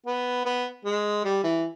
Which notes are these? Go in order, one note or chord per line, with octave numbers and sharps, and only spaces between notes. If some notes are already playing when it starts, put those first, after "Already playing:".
B3
B3
G#3
G3
E3